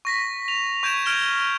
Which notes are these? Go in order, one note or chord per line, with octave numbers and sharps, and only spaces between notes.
C#6 A#6 B6
F7
C#6 G6 G#6 D7 E7
F6 G#6 D7 E7 F7 G7